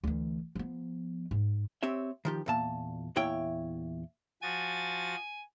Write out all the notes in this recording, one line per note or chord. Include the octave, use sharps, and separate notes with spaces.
D2 E3
F3 B3
G#2
C4 G4 C#5 E5
D#3 F3 G4
E2 A#2 A5
E2 A#2 E4 C#5 G5
F3 F#4 G#5 A6